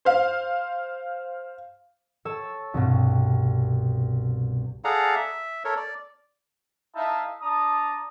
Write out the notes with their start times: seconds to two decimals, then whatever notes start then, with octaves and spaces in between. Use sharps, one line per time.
0.05 C5 F5
2.25 A4 C#5 A5 E6
2.74 C2 G2 B2
4.84 G#4 A4 D5 F5 F#5 A#5
5.16 E5
5.65 A4 A#4 C#5
5.77 D5
6.95 A3 D#4 E4 E5 F5 A5
7.41 D4 A5 A#5 D#6